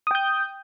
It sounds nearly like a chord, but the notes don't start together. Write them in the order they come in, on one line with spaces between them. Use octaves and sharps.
D#6 G5 G6